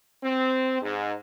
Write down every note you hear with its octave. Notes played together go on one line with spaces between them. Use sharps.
C4
G#2